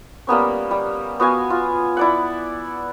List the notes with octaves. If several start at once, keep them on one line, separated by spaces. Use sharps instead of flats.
G3 A#3 B3 C#4
G3
B3 F#4 F5 G#5
F4
E4 D5 F#5